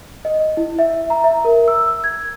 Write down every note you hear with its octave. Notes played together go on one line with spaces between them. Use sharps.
D#5
E4
E5
A#5
E5
A#4
E6
G#6